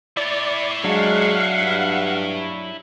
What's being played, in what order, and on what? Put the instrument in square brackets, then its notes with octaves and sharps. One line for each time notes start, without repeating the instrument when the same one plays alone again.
[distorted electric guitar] E4 C#5 [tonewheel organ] D5
[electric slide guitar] F#3 D4 [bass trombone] G#3 [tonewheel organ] F5 F#5
[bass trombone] G2